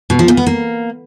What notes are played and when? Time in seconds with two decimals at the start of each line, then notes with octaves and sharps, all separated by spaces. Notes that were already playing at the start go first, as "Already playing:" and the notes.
0.10 B2
0.19 F3
0.28 A#2
0.37 B3
0.46 A#3